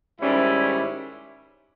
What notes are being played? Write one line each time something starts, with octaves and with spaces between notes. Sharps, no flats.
G#2 D#3 G3 C#4 E4